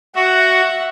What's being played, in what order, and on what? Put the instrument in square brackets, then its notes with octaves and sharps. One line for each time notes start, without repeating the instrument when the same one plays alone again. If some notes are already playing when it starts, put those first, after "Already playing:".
[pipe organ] F#4 [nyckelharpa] E5 F#5